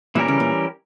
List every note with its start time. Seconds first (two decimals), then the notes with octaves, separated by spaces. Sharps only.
0.15 A#2 E3 G3 C#4 G4 A#4
0.28 C#3
0.40 A#2